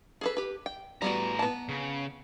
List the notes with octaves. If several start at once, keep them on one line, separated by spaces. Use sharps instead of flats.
G#4 A4 B4
G4 B4
G5
A2 G3 B3 F#4 A#5
B3 A5
C#3